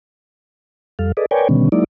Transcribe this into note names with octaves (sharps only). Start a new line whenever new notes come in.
F2 G3 A4 F5
G#4 A4 B4 D5 D#5
A#4 B4 C#5 D5 G5 G#5
B2 D3 D#3 G3 B3 C#4
F#3 G#3 A#3 D#4 E4 D5